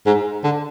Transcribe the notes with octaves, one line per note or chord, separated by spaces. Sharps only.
G#2
D3